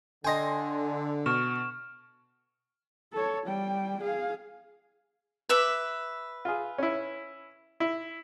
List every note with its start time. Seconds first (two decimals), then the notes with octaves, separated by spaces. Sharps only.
0.24 D3 D#5 G5 G#5 C6 A#6
1.26 B2 C#6 F6 E7
3.13 A4 C#5
3.47 G3 G5
4.01 G#4 F5
5.49 B4 E5 D6
6.45 F4 G#4
6.78 C#4 E4
7.80 E4